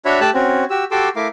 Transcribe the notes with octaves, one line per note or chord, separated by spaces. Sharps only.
D4 F#4 C#5 E5 B5
A3 G4 A5 E6 F#6
C4 C#4 F#4
F#4 G4 E6
F#4 G4 A4 C6 D6 E6
A3 E4 A#4 F5 D6